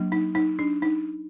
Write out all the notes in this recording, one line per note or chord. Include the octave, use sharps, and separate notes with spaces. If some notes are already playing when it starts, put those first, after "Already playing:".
Already playing: F#3 A#3 D4
D#4
D#4
D4
D#4